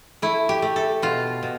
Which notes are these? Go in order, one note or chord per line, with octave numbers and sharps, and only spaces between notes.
A3 E4
G4
A3
A4
B2 F4
B2